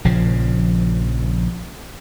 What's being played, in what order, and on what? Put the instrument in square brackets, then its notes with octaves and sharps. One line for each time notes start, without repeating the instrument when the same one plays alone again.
[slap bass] A#1 C#3 F3